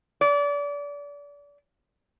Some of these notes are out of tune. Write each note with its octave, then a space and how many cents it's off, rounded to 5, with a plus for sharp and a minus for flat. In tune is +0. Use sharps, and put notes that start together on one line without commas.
D5 -30